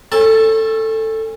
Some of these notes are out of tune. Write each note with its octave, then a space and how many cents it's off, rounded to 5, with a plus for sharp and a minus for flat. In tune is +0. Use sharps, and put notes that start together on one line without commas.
C#4 -30 A4 +10 A5 +0